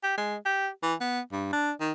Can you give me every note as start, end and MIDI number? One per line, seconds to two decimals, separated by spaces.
0.04 0.17 67
0.18 0.36 56
0.46 0.69 67
0.83 0.95 52
1.01 1.20 59
1.32 1.51 43
1.53 1.72 62
1.81 1.92 51